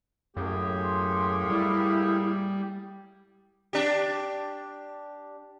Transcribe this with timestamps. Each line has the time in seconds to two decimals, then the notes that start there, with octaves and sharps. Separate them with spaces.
0.37 F#2 A2 A#3 G4 G#4
0.84 C6
1.50 G3 E4
3.73 D4 G4